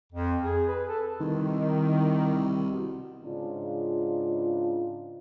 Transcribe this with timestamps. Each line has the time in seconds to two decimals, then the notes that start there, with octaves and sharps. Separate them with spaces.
0.12 F2
0.44 G#4
0.67 B4
0.88 A4
1.20 C2 D#3
2.72 B2
3.24 G#2 C#3 D4 F4